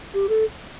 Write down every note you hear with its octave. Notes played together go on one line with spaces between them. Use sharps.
G4
A4